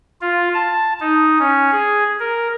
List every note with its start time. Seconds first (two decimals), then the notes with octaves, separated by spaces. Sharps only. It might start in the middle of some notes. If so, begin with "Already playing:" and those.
0.21 F4
0.54 A5
1.00 D#4
1.39 C#4
1.72 G#4
2.20 A#4